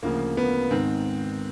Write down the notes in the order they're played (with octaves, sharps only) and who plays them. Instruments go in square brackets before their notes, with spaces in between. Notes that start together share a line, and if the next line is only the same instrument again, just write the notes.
[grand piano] D2 C#3 F3 A#3
B3
G#2 D#3 C4